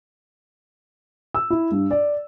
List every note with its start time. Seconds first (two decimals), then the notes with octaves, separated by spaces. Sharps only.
1.34 E6
1.50 E4
1.72 G2
1.91 D5